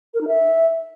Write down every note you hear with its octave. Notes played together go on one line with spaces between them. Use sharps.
A#4
D#4
E5